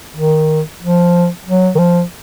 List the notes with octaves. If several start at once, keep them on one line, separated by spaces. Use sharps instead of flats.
D#3
F3
F#3
D#3
F3